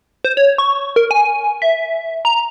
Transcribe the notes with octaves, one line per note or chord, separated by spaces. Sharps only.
C5
C#5
C#6
A#4
G#5
E5
A#5